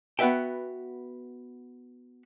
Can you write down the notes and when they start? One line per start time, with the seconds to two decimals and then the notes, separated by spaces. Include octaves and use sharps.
0.19 B3 F#4 B4 E5 G5